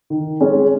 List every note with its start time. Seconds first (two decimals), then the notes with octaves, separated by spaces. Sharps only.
0.10 D#3
0.41 G#3 C#4